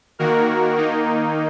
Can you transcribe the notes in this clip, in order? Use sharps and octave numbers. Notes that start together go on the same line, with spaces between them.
D#3 A#3 F#4 A#4
D#3 A#3 D#4